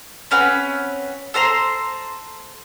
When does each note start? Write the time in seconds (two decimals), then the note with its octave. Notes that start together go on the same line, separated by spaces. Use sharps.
0.31 C4 C#4 B4 F#5
1.34 A4 C5 A#5 C6